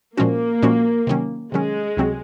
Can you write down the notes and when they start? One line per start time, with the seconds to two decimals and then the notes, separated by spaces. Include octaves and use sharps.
0.17 A#2 F3 G#3 A#3 C#4 F#4
0.62 A#2 F3 G#3 C#4 F#4
1.07 C3 D#3 F#3 C#4
1.52 C3 D#3 F#3 G#3 C#4
1.97 C#2 C3 F#3 C4 F#4